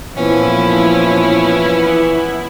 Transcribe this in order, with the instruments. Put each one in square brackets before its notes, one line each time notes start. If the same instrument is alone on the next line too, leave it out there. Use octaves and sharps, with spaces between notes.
[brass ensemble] A#2 F3 [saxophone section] E3 B3 [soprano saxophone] C#4 [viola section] E4